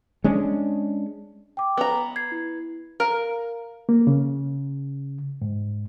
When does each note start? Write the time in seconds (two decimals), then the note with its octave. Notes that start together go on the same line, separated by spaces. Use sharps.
0.24 G#3 C#4 D4
1.57 G5 D6
1.77 B3 A#5
2.16 G#6 C7
2.32 E4
3.00 A#4 F5
3.89 A#3
4.07 C#3
5.42 G#2